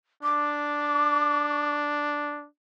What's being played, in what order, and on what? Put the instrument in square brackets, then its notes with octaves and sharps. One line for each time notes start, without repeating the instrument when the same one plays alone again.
[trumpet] D4 [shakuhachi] D6